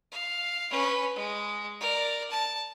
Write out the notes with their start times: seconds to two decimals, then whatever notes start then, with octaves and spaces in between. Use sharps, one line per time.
0.11 F5
0.71 C#4 B4
1.15 G#3
1.81 A#4 D5
2.31 A5